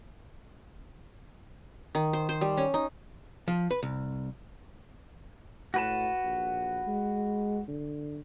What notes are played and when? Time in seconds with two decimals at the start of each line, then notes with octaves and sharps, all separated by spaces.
1.95 D#3
2.13 C5
2.29 C5
2.41 G3
2.57 C#4
2.74 D#4
3.48 F3
3.71 B4
3.83 C2
5.74 A2 F#4 B4 A5
6.24 A#1
6.87 G#3
7.68 D3